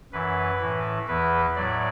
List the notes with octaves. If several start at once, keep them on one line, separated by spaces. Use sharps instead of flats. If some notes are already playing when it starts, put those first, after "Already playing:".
F#2 E3 B4
A2 E3
E2 E3 B4
A2 F#3 D5